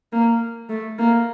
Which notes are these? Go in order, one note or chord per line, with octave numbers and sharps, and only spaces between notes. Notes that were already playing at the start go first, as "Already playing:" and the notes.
A#3
A3
A#3